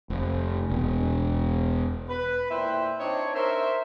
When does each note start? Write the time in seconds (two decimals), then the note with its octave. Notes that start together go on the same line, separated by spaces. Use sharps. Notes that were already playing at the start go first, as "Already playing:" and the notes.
0.10 F1
0.70 E1
2.09 B4
2.50 A#2 E4 C5 E5 G5
2.99 C4 D4 D#4 C#5
3.35 A#4 C5 E5